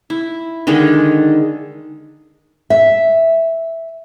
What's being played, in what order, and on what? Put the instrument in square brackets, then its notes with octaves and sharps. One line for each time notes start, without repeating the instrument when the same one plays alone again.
[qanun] E4
D3 D#3 G#3 G#4
[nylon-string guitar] E5